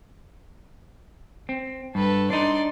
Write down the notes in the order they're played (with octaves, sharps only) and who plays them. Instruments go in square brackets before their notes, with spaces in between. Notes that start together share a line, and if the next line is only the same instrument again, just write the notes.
[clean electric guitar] C4
[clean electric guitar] G2 [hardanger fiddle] A4 B4
[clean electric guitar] D4 D#4 [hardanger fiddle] D5 C6